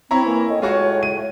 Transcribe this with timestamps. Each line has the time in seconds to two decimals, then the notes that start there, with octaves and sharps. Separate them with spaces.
0.11 C4 E4 C#5 A#5
0.26 E3 A#3
0.49 A2 D#5
0.62 G#3 F4 F#4 C#5 C#6
1.03 D#7